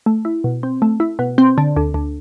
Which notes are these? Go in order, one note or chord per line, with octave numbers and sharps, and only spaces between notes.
A3
E4
B2
C4
A3
E4
B2
C4
D3
D2
D2